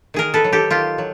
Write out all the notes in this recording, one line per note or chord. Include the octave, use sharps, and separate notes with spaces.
D#3 G#4 A#4
A4 B4
F#3
G4 A4
D#3 F4 G4
F#3